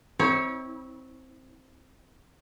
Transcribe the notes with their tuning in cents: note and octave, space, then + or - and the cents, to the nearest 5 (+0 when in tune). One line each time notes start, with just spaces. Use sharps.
C4 +0 E4 -45 C#5 +0